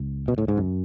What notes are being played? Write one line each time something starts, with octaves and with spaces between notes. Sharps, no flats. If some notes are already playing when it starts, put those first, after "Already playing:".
Already playing: C#2
B2
A2
G#2
F#2